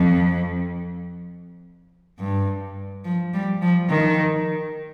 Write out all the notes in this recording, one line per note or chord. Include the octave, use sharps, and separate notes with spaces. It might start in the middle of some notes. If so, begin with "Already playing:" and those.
Already playing: F2
G2
F3
G3
F3
D#3